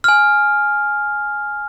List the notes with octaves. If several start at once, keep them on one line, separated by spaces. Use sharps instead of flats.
G#5 F6